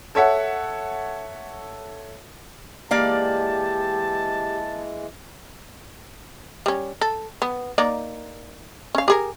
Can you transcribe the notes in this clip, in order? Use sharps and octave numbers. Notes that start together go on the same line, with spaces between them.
A4 C#5 E5 F#5
E3 G#3 A#3 G4 D5 F5 A5
G3 C#4
A4
B3
A#3 D#4 D5
C#4 F5
G4 G#4 A#4